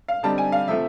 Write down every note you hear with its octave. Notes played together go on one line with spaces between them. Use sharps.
F5
D3 G3 C4 D#4 A5
G#5
F5
C3 F3 A3 E5